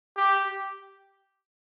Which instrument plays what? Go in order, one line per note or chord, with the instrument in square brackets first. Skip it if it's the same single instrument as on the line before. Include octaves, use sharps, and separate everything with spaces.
[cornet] G4